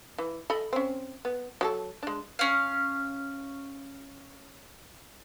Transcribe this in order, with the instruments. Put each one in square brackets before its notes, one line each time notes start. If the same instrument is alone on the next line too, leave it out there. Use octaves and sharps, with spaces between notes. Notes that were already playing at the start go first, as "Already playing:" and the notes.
[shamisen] E3
A4 D#5 B5
C4 C#4
B3
F#3 G4 A4
G#3 D4
[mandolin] C#4 F5